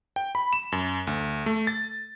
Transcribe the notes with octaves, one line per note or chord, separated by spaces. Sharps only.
G5
B5
E7
F#2
D2
A3
A6